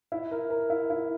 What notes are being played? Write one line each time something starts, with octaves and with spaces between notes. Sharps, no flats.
E4
A#4
A#4
E4
E4